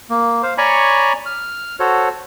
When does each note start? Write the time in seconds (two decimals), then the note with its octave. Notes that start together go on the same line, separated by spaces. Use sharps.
0.10 A#3
0.43 C5 F5
0.58 C#5 D5 G#5 A#5 B5 C#6
1.26 F6
1.80 F#4 A4 C5 C#5